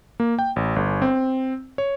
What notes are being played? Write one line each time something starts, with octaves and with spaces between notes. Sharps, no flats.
A#3
G5
A1
G1
C4
C#5